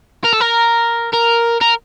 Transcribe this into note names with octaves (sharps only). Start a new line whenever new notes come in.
A#4
A4
A#4
A#4
A#4